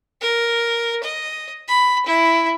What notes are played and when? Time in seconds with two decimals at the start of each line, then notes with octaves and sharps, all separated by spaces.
0.21 A#4
1.03 D#5
1.68 B5
2.06 E4